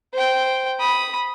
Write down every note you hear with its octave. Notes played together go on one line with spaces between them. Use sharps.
C5 G5
B5 D#6